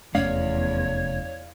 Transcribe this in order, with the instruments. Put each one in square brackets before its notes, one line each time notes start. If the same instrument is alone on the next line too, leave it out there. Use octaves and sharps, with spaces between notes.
[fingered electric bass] F1 A3 C#4 [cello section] E2 [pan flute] C#5 [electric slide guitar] D5 F5